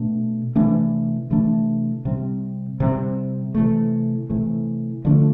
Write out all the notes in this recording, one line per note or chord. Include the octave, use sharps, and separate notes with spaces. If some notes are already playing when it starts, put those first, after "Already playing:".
Already playing: B2 A3 D4
C3 E3 A3 D4
C3 E3 A3 D4
C3 G3 C4
C3 G3 C4
C3 E3 A3
C3 E3 A3
D3 F3 A3 D4